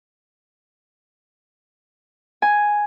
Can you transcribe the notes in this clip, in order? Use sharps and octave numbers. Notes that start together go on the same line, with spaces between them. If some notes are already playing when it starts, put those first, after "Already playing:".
G#5